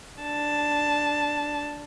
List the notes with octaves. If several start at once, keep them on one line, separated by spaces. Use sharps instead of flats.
D4 A5